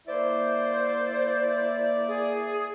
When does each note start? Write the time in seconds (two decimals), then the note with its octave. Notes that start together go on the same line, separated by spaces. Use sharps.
0.08 A#3 E4 C5 D5
2.08 G#4